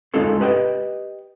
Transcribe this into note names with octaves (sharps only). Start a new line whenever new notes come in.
G#3 C#4 D#4 F4 A4 C6
G4 B4 D#5 G5